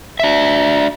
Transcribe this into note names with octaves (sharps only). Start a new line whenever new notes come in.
D4 E5